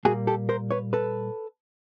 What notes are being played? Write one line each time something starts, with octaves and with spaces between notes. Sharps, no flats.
A#2 G3 A#3 F#4 G#4
G4 A4
A#4 C5
B4 C#5
A4 B4